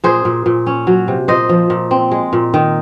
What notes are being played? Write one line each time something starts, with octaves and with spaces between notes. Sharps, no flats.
A#2 G#4 C5
A#2
A#2
C#4
F#3
C3
A#2 C5 D#5
F3
A#2
C4
G#3
A#2
D#3